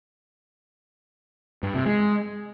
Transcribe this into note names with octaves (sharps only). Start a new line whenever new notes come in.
G2
C3
G#3